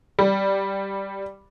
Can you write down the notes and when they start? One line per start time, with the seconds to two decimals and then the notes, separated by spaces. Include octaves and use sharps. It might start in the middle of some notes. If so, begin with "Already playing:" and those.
0.19 G3